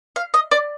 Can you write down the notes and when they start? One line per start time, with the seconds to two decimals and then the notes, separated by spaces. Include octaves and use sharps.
0.16 F5
0.34 D#5
0.51 D5